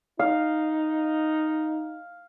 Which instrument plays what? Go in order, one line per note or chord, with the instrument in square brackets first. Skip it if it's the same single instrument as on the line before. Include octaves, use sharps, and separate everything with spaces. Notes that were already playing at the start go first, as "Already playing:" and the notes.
[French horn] D#4 [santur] F5